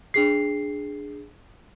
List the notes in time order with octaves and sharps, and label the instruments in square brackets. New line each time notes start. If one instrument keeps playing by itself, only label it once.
[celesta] D4 G#4 C7